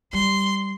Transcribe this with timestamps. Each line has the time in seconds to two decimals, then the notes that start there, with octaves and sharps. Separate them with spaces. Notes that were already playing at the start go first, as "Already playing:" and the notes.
0.13 G3 C6